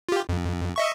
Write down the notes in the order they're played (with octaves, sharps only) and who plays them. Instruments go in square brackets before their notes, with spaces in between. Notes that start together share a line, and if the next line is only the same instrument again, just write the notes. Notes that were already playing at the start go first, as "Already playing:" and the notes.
[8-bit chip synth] F4 G4
F2
D#5 E5 C#6